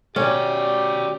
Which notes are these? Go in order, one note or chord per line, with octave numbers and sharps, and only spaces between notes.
B2 C#4 F#4 G4 D5